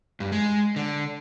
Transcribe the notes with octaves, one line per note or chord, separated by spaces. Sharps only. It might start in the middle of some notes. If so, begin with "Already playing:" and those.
G2
G#3
D3